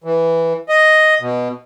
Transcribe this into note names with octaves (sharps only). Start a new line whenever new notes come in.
E3
D#5
B2